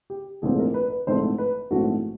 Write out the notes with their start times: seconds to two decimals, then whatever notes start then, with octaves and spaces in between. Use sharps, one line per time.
0.10 G4
0.42 A#1 G#2 E3 A3 C4 G#4
0.59 A#4
0.74 B4
0.90 B4
1.07 A#1 G#2 E3 A3 C4 C5
1.38 B4
1.71 A#1 G#2 E3 A3 C4 F#4